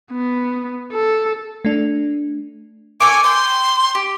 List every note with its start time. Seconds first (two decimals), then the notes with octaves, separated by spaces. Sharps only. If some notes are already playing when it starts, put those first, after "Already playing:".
0.12 B3
0.92 A4
1.65 A3 D4
3.00 A4 C#5 G#5 D6
3.24 G5 C6
3.95 G4